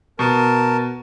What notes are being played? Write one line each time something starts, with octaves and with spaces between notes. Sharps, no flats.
B2 A#4 A5